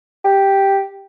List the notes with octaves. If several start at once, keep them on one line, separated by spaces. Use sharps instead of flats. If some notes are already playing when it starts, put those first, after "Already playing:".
G4